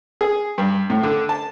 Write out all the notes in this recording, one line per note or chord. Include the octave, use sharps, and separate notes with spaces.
G#4
G2
A2
D3
A5